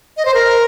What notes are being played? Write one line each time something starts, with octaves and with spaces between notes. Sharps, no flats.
D#5
C5
A#4